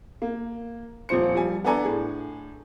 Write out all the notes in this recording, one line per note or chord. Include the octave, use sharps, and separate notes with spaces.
A#3
D#1 F2 F4 C5 C#7
F3 G3 G#5
B3 D4 A4 D5 G#5 A#5
A2 D4 G#4